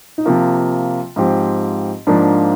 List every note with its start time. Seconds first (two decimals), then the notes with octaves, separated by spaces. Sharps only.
0.18 D#4
0.25 C3 F3 A#3 F4
1.16 G#2 F3 C4 G4
2.07 G#2 F3 A#3 D4